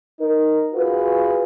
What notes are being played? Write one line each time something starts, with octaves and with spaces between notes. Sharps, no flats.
D#4 A#4
F4 F#4 G#4 B4